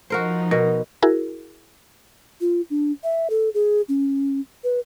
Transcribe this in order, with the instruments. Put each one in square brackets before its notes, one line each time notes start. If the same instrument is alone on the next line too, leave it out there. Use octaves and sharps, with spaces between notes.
[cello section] F3 D#4 [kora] F#4 A#4 C5
[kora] B2 [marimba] A#4
[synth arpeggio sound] E4 F#4 G#4 A#4
[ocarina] F4
D4
E5
A4
G#4
C#4
B4